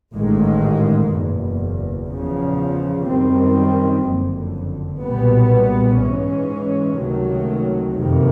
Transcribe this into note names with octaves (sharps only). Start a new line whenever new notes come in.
A1 G#2 D#3 G#3
F#1 E2 B2
E2 C#3 F3
F#2 D#3 G3 C4
F#1 F2 D3
B1 A#2 G3 B3
G#2 E3 G#3 C#4
C#2 C3 D#3 F#3 A3
F#1 F2 C3 D#3